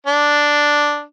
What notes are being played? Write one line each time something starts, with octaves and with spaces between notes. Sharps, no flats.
D4